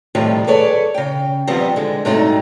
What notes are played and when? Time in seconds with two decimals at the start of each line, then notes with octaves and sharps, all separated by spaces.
0.15 A2 C3 D#3 F3 G3
0.47 G#4 A4 B4 C#5 D5
0.94 C#3 G5
1.47 D#3 F3 G3 B3 C4 G4
1.76 D3 G#3
2.05 G#2 C3 F#3 G3 A3 D#4